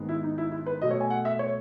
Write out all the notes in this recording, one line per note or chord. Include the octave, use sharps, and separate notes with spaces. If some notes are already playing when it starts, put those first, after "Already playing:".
Already playing: G#2 D#3 G#3 B3
E4
D#4
E4
E4
B4
B2 F#3 A3 D#5
C#5
G#5
F#5
E5
C#5